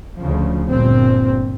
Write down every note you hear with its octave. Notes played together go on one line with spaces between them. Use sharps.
D2 C#3 F3
G1 G2 A#2 C4